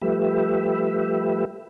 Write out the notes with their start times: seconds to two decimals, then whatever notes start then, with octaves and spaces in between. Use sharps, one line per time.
0.02 F3 G3 A3 G4 B4 E5